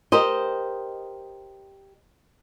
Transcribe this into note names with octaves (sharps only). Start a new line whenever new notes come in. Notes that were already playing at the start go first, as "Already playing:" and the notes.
G4 A#4 C5 D#5